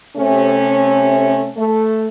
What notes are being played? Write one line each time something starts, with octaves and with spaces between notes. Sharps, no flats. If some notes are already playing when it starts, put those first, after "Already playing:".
C3 A3 C#4
A3